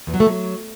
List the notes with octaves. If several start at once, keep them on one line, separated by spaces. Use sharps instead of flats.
E2
F#3
A3
F#3